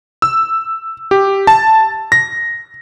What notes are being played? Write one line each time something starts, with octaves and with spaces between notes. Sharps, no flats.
E6
G4
A5
A#6